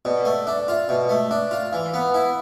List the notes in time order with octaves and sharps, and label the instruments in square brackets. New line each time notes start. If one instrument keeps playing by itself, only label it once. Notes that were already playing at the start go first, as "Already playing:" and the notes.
[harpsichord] B2 [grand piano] D5
[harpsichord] A3
[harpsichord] D4 [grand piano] E5
[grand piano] D5
[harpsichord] F4 [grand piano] E5
[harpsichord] B2 [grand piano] E5
[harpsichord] A3
[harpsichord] D4 [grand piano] E5
[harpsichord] F4
[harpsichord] E3 [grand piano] F5
[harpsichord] B3 [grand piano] F5
[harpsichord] E4